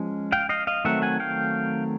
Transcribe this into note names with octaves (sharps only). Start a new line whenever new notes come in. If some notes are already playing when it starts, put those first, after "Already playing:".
Already playing: F3 G#3 C#4
F5 G5
D#5 F5
D#5 F5
D#3 F#3 A3 C4 E5 F#5
F#5 G#5
F5 G5